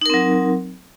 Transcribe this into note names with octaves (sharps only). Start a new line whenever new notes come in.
F#3 C4 D#4 A#4